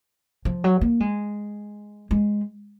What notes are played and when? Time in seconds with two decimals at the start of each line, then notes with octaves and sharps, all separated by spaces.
0.45 F3
0.64 F#3
0.81 A#3
1.00 G#3
2.11 G#3